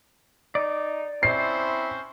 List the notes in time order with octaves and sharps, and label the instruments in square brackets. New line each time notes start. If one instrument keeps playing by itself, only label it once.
[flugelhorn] D#4 [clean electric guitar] D5
[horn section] C4 C#4 C5 [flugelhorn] E4 [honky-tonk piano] C7